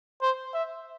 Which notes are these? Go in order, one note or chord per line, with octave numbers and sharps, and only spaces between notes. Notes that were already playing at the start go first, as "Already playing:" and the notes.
C5
E5